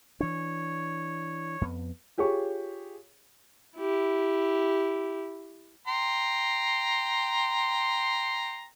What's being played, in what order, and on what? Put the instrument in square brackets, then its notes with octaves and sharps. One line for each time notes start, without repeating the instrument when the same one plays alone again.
[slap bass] E3 D4 [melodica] C#5
[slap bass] F2 B3
[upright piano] F4 G4 G#4 C#5 C#6
[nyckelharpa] E4 G4
[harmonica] G5 A#5 C6